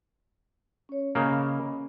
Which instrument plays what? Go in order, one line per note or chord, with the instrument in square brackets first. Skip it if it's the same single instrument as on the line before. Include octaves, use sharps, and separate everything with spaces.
[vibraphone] C#4 C#5
[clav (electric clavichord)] C#3 A#3 [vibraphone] C#4 D#5 B5